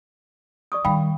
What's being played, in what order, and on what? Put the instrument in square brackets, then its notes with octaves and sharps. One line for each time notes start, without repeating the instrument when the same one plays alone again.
[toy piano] D5 C#6 D#6
[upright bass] D#3 G3 [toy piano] F5 G5 B5